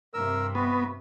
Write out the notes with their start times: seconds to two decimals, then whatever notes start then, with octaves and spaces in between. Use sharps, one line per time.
0.14 G2 C3 A#4 E6
0.55 B3 F#4